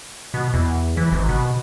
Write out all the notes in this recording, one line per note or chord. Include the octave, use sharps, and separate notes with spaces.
B2
E2
E3
G#1
B2